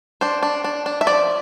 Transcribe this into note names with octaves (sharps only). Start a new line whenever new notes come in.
D4 C5
D4
D4
D4
E5
F3 D5